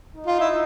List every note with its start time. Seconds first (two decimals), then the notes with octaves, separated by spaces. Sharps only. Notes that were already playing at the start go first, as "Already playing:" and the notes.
0.15 D#4
0.26 F4
0.40 E4